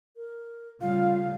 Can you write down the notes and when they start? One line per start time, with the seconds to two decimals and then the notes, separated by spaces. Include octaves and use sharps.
0.16 A#4
0.81 C#3 G3 A3 F4 F5